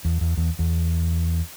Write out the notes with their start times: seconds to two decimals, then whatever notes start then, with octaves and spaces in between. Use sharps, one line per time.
0.05 E2
0.21 E2
0.37 E2
0.59 E2